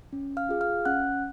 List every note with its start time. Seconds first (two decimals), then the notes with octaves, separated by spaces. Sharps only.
0.13 C#4
0.37 F5 F6
0.49 F4 G#4
0.61 F5 F6
0.85 C#4 F#5 F#6